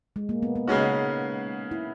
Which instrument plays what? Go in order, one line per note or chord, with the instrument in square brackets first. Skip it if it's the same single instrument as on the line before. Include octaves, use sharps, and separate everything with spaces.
[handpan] G#3
A#3
B3
B3
[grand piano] C#3 G#3 C#4 F#4 [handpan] D#4
[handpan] E4